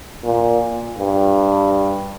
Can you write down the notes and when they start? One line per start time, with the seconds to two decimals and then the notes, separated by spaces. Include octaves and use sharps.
0.24 A#2
0.98 G2